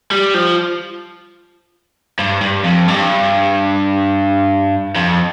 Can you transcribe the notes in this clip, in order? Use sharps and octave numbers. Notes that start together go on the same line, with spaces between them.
G3
F3
G2
G2
F2
G2
F2